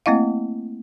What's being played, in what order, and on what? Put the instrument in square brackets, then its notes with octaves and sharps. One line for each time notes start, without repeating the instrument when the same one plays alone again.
[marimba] A3 A#3 C4 E4 D#5 F5